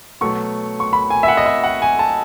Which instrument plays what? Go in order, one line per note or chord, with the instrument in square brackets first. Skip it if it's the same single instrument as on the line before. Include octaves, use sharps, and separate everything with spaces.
[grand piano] B2 F#3 A3 C#6
C#6
B5
G#5
E5
F#5
D#5
E5
F#5
G#5
A5